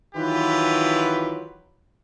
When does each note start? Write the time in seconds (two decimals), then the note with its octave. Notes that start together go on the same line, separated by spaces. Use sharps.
0.15 D#3 E3 F#3 F4 G4 B4